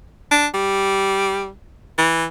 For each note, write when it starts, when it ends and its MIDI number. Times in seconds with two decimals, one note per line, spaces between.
0.32 0.47 62
0.54 1.50 55
1.98 2.26 52